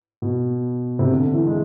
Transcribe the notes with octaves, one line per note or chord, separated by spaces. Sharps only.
B2
C3
D3
E3
G#3